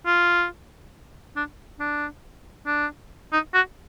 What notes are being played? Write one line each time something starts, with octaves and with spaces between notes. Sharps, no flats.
F4
D4
D4
D4
D#4
F#4